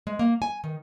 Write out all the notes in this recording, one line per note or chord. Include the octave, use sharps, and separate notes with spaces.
G#3
A#3
G#5
D#3